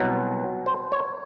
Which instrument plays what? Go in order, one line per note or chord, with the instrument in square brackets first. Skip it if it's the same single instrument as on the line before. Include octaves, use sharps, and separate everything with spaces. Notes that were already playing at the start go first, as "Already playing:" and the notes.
Already playing: [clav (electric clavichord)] C2 B2 F#3
C5
C#5